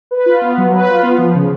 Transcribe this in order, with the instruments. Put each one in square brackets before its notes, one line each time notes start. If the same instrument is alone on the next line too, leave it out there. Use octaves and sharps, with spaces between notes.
[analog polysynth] B4
F4
B3
F#3
B4
F4
B3
F3
C#3